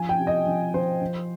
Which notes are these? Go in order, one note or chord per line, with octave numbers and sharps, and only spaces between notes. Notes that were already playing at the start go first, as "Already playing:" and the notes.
Already playing: F3 G#5
G5
C3
D#5
F3
F3 C5
F3